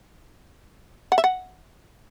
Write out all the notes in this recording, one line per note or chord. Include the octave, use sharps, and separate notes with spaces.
F#5
E5
F#5